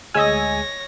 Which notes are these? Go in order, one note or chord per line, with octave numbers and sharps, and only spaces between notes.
D2 G#3 C#5 D#5 G#5 E6 A#6